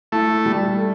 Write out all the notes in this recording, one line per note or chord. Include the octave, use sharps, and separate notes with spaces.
A3 E4
G3
A3